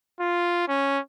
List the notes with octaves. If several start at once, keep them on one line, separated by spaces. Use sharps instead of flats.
F4
C#4